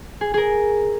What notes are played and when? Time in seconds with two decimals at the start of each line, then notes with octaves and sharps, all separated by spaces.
0.21 G#4
0.34 G#4 A#4